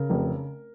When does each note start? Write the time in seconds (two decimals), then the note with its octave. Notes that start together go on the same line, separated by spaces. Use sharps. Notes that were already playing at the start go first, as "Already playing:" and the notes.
Already playing: C#3 A#4
0.10 F1